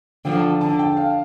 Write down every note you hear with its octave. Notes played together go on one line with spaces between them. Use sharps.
D3 F3 G5
A5
A5
D3 A5
G5
F5